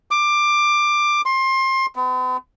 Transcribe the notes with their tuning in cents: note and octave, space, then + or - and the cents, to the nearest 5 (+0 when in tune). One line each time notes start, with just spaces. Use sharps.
D6 +15
C6 +25
B3 +45